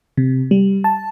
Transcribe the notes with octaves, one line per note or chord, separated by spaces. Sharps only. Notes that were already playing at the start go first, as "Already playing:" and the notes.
C3
G3
A5